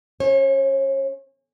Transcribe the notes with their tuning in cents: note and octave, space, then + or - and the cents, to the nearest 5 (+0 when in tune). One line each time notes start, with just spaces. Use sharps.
C#4 +0 C#5 -40